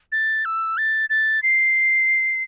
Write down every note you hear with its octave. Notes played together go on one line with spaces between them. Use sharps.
A6
E6
A6
A6
C7